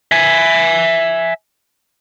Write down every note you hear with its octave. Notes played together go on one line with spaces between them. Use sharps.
E5 G#5